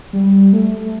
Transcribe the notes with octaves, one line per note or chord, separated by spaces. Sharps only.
G3
A3